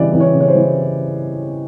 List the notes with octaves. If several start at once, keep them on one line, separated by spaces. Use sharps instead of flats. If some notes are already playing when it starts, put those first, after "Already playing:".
Already playing: C#3 E3 G3 D5 D#5
E3
C#5
C#3
C#5
C5
E3